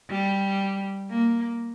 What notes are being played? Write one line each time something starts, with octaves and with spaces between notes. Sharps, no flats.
G3
A#3